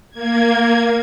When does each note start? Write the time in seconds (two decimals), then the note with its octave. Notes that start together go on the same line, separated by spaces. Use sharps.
0.11 A#3 G#6